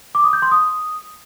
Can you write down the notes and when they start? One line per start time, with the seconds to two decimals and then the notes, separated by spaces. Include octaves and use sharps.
0.15 D6
0.24 D#6
0.33 G6
0.42 C6
0.52 D#6